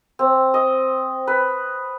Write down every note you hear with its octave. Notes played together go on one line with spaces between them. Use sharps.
C4
D#5
B4